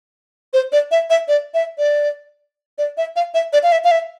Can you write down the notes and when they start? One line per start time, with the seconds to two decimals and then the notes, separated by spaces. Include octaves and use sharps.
0.53 C5
0.72 D5
0.91 E5
1.10 E5
1.28 D5
1.54 E5
1.78 D5
2.78 D5
2.97 E5
3.16 F5
3.34 E5
3.53 D5
3.63 F5
3.72 E5
3.84 F5
3.91 E5